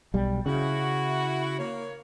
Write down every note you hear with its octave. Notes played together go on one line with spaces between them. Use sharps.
B1 G3
C#3 E4 F#4
A#3 C#5